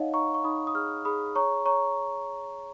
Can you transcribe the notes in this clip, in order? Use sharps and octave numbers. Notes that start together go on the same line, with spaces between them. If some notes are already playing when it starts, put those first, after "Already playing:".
Already playing: D#4 C#5 D#5 F5 F#5
D#4 A#5 C#6
C#6
D#4 B5 D#6
D#6
G#4 C#6 F6
G#4 B5 D#6
C#5 A#5 C#6
C#5 A#5 C#6